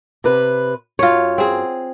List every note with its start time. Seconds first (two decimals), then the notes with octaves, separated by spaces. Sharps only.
0.24 C3 B4
0.99 F#2 F4 C#5
1.38 C4 G#4